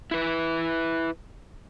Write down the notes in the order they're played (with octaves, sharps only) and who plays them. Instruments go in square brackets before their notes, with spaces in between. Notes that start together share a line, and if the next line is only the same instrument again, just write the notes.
[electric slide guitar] E4 B4